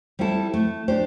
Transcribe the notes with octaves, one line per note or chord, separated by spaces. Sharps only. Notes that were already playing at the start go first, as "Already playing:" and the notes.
G3 C4 E4 A4
A3
D4 G4 C5